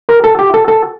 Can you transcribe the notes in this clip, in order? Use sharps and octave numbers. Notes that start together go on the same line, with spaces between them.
A#4
A4
G4
A4
A4